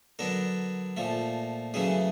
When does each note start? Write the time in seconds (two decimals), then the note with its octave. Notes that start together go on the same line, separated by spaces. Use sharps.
0.19 D3 F#3 B3 D4 A#4
0.97 A#2 F3 A3
1.74 F#2 C#3 E3 A3 G#4